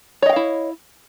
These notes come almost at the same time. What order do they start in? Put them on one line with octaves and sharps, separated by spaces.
C#5 D#5 G5 F5 E4